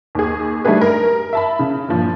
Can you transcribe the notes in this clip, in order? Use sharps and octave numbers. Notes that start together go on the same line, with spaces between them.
D#2 G#4
G3 A3 D4 D#4 G#4 B4
A#4
E5 A5 B5
C#3
G2 A#2 F3